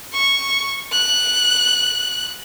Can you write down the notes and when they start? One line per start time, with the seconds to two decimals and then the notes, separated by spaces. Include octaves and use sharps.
0.13 C#6
0.92 F#6